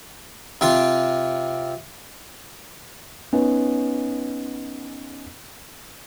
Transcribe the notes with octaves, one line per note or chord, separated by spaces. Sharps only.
C3 C4 F4
B3 C#4 D#4